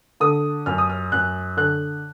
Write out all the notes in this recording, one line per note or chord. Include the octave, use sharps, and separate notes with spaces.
D3 D#6
F#2 F6
D#6
F6
F#2 F#6
D3 F#6